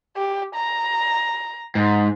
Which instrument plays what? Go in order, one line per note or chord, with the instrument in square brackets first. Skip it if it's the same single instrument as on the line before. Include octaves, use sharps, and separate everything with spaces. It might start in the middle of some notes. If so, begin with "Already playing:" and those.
[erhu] G4
A#5
[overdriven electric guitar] G#2